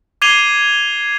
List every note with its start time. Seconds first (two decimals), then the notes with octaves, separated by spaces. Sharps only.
0.22 D6 G#6 C7 D#7 F7 G7